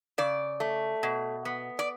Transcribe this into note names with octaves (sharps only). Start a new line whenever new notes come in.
C#3 D5
A3
B2
B3
D5